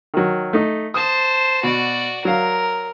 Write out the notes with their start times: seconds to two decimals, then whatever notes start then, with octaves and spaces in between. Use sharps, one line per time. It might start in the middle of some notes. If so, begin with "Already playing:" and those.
0.14 D#3 F#3
0.53 A3 D#4
0.94 C5 A5 D#6
1.63 B2 F#4 D5
2.25 F#3 A#4 F5